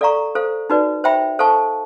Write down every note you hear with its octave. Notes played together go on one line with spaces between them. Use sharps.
A4 D5 F5 A#5 C#6
A4 C5 F5
D#4 F#4 B4 D5
C5 E5 G5 B5
A4 C5 F5 A5 C#6